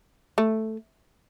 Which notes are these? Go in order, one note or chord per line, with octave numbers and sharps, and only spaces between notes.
A3